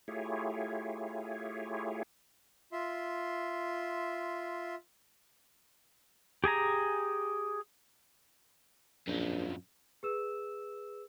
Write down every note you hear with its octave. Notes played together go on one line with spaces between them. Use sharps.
A3 E4 F4 G4 G#4 C#5
F4 E5 C6
G4 G#4 G#5 A#5
A#1 F#2 F3
G#4 B4 E6 E7